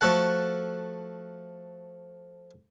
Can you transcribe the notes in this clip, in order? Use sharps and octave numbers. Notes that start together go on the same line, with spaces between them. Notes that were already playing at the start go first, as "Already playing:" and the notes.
F3 A3 F#4 A4 F#5